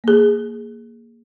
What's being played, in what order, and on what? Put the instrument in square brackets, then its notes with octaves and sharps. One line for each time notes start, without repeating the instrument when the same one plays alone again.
[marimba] A#3 G#4